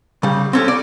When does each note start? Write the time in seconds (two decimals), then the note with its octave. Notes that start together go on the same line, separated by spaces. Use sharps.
0.23 C#3 G3
0.53 C4 C#4 A4
0.68 D5